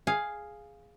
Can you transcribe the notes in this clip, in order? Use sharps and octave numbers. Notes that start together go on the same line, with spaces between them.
G#4 F5